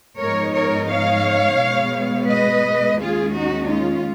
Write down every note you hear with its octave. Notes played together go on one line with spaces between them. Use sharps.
G#2 F3 G#3 B3 D#4 A#4 C#5
A#4 C#5
C#5 F5
B2 G#3 B3
B4 D#5
D#2 D#3 G#3 C#4 F4 G#4
D#4 F#4
F4